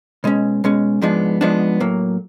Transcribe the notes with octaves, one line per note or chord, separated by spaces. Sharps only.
B2 G#3 C#4
B2 G#3 C#4
G#2 F3 G#3 B3 D4
G#2 F3 G#3 B3 D4
A2 F#3 A#3